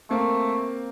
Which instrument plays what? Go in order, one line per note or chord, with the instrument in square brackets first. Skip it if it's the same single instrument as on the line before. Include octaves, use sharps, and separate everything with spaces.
[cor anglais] A3 [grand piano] A#3 C4